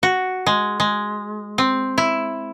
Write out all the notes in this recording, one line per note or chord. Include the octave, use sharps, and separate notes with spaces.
F#4
G#3
G#3
C4
E4